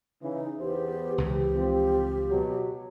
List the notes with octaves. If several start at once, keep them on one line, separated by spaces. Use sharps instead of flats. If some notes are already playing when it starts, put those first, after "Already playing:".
C#3 E3 D#4
E2 B3 G4 C5
C#2 C#3 E3 G4
F3 C4
B2 F#3